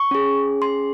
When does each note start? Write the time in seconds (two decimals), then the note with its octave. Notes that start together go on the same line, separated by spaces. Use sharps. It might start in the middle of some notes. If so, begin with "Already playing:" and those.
Already playing: C#6
0.11 C#4 G#4
0.62 C6